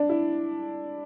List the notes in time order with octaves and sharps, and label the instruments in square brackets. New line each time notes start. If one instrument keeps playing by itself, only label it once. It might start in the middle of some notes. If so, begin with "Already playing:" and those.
Already playing: [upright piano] D4 [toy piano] D5
[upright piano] E4